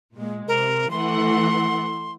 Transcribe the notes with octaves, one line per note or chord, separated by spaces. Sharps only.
A#2 G#3
C3 A#4
E3 A3 F#5 C6